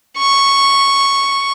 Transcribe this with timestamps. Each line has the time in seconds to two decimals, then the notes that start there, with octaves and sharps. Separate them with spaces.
0.18 C#6